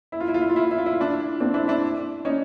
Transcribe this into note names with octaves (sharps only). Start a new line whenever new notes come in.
E4
F4
E4
F4
E4
F4
E4
F4
E4
F4
E4
F4
D4 E4
C4 D4
D4 E4
D4 E4
C#4 D#4